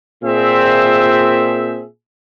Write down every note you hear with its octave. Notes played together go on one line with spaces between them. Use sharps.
A#2 C4 G#4 E5